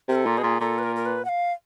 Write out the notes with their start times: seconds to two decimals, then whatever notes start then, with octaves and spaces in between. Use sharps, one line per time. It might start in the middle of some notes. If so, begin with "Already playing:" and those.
0.09 C3 A#4
0.15 A4
0.26 A#2
0.38 B2 G#4
0.43 A#2
0.60 A#2 A4
0.78 B4
0.83 A#4
0.96 A#4
1.06 B4
1.25 F#5
1.29 F5